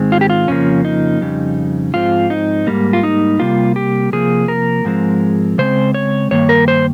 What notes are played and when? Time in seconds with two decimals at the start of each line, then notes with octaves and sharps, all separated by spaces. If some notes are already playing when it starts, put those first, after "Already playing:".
Already playing: G#2 D#3 G#3 C4
0.12 F4
0.21 G4
0.30 F4
0.48 F2 C#3 F3 A#3 C#4
0.85 D#4
1.21 F2 C#3 G3
1.94 G#2 F3 C4 F4
2.30 D#4
2.67 G#2 G3 A#3
2.93 F4
3.03 D#4
3.39 C3 G3 A#3 F4
3.76 G4
4.13 C3 F3 A#3 G#4
4.48 A#4
4.85 G#2 F3 G#3 C4
5.58 C#3 G#3 C4 C5
5.94 C#5
6.31 G2 D#3 A#3 C#5
6.49 A#4
6.68 C5